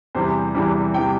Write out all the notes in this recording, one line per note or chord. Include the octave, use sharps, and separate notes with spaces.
E2 C3 E3 G3 C5
E2 C3 E3 G3
C3 E3 G3 G5